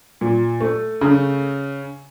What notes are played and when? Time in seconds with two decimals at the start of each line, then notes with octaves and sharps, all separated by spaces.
0.21 A#2
0.60 A3
1.01 C#3